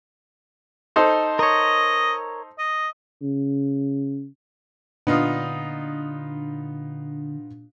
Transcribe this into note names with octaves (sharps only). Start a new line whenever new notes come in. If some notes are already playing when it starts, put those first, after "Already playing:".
D#4 A4 C5
A#4 C#5 D#5
D#5
C#3
A#2 D3 B3 D4 D#4 F4